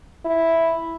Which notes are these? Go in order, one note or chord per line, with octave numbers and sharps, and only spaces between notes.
E4